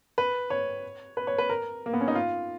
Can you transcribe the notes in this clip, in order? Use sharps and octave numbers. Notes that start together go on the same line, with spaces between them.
B4
C#5
B4
C#5
B4
A#4
A#3
B3
C#4
D#4
F4